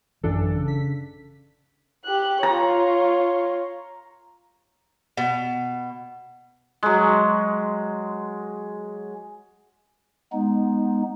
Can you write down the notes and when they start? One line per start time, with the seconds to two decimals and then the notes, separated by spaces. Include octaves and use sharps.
0.23 A1 F#2 E3 D4 A4
0.54 C#3
0.68 B6
2.06 G4 F#6
2.43 F4 C#5 A#5
5.17 B2
6.83 F#3 G#3
10.32 G#3 B3 D#4